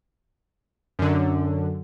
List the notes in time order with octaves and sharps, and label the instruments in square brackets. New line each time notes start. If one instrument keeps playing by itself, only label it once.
[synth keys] F#2 D3